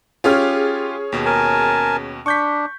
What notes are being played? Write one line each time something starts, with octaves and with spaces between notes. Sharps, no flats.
C#4 F4 G4 G#4 F6
D#2 B2
A#4 G#5 A5
D4 C#6 G6 B6